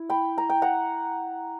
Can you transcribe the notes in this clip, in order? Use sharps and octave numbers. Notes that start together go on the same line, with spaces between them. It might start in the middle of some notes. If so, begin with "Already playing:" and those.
Already playing: E4
G5 B5
A#5
G5
F#5 A#5